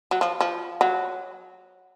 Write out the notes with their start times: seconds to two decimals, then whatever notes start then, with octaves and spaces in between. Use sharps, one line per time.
0.11 F#3
0.21 F3
0.41 F3
0.81 F#3